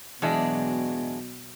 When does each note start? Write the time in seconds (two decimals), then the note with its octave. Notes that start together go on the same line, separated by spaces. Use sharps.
0.22 E2 B2 F#3 G#3 D4